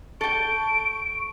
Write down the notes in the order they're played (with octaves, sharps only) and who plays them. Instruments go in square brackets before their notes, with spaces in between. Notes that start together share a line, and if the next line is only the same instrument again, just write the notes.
[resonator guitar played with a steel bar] A4 G5 [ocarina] C#6 [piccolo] D7